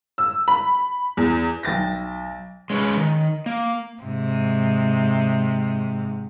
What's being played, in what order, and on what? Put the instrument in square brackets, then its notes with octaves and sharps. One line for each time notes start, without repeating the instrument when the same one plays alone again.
[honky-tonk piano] E6
B5
E2
[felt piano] B1 G5 A6 A#6
[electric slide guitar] G#3 C#4 B4
D#3
A#3
[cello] G#2 C3